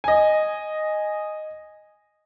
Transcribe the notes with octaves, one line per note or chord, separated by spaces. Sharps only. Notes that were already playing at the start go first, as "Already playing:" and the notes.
D#5 G#5